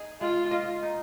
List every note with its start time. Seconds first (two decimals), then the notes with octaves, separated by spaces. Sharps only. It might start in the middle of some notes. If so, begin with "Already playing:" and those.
Already playing: D#4 G#4
0.21 G#3 F4
0.51 D#5
0.83 D#4